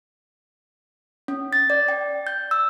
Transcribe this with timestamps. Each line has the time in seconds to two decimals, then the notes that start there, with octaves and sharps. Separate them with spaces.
1.28 C#4
1.53 A6
1.70 D5
1.88 G5
2.27 G6
2.51 E6